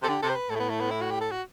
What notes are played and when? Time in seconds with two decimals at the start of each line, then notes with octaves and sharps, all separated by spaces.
0.02 C3 A4
0.08 D3 G4
0.23 C3 A4
0.30 C5
0.36 B4
0.50 A2 A4
0.56 A3
0.60 B3
0.70 A3
0.81 B3
0.91 E4
1.01 F#4
1.11 G4
1.21 A4
1.32 F#4